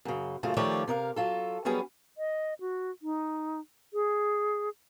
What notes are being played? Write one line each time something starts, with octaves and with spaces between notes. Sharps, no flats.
F#2 C#3
F#2 C#3 A3 F4
D#3 F3 A3 G4 C#5 D5
C3 A#4 D#5 F5
F#3 F4 A4
F#3 G3 B3 C#4 G#4
D#5
F#4
D#4
G#4